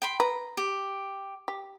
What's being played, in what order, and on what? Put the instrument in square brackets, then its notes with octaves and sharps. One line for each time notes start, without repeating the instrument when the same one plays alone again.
[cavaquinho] G5 B5 C6
[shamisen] B4 [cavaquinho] A#5
[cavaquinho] G4
[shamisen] G4